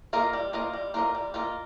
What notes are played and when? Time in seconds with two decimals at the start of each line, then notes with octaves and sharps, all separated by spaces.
0.13 A#3 F4 A#4 D#5
0.33 G3
0.53 A#3 F4 A#4 D#5
0.73 G3
0.94 A#3 F4 A#4 D#5
1.15 G3
1.34 A#3 F4 A#4 D#5